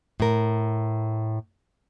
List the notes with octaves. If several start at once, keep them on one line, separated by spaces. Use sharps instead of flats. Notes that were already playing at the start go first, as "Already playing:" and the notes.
A2 A#4